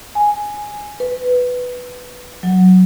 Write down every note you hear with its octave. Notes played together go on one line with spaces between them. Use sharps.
G#5
B4
F#3